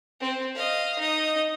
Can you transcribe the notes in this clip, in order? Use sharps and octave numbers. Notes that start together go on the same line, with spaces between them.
C4
D#5 F5
D#4 D#5